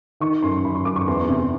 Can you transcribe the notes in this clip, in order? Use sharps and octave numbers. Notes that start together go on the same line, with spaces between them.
D#3 C#6
F#2 C6
F#2 B5
C#6
F#2 D6
C#6
E2 C6
C3